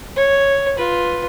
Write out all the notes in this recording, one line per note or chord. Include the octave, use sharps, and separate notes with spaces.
C#5
F4 B4